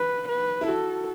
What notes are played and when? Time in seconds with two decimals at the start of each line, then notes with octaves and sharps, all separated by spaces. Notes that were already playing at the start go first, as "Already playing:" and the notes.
Already playing: B4
0.29 B4
0.61 E4
0.68 F#4 A4